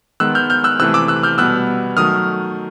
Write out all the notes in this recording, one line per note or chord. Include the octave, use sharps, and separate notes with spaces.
D#3 G#3 B3 E6 F#6
F6 G6
F6 G6
E6 F#6
C3 E3 A3 E6 F#6
D6 E6
E6 F#6
F6 G6
B2 G3 B3 E6 F#6
D#3 F#3 A3 D#6 F6